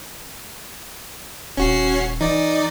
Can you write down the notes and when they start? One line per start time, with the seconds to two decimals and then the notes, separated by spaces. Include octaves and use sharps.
1.57 D#1 C#4 F#4 C7
2.21 E3 D#4 D5